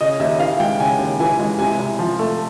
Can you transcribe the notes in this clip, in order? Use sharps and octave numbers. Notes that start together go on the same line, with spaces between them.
C#3 D#5
D#2 E5
E3 F5
G#3 G5
C#3 G#5
D#2
E3 G#5
G#3
C3 G#5
C2
F3
A3